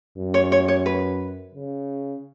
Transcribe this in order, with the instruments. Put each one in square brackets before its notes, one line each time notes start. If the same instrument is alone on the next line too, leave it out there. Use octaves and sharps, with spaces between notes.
[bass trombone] F#2
[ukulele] C#5
C#5
C#5
B4
[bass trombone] C#3